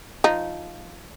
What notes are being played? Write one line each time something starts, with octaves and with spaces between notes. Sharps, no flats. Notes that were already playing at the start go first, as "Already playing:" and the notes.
F3 D#4